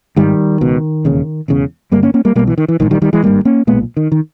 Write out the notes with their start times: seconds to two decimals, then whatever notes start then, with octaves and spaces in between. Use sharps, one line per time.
0.16 G#1 G#2 D#3 G3
0.61 C#2 B2
1.05 E1 D#2 C#3
1.48 E1 E2 C#3
1.91 G1 G2 G3 A#3
2.03 A#3 C#4
2.14 A#3 C#4
2.25 G3 A#3
2.35 B2 G3 A#3
2.39 B1
2.47 E3
2.58 D#3
2.68 E3
2.80 A#1 G#2 D#3
2.91 D#3 G3
3.02 D#3 G3
3.13 E3 G#3
3.23 G#1 G2 G3 A#3
3.45 A#3 C#4
3.67 B1 A#2 G#3 B3
3.97 D#3
4.12 D#3